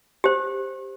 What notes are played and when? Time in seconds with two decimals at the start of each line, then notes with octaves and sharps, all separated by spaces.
0.24 G4 C5